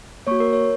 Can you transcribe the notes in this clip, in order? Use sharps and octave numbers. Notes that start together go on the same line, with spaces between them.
A#3 F#4 C#5 C#6
A#4
C#5